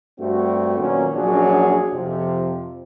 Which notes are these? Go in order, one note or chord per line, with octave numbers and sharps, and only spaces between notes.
G2 A3 C4 F#4
A#2 D#3 F#3 A#3 B3 C#4
A#1 F#3 C#4 D4 F#4 G#4
F2 C3 F3